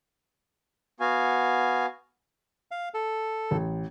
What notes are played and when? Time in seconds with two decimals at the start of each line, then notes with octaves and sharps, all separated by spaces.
1.00 B3 F#4 F5 G#5
2.71 F5
2.94 A4
3.51 A1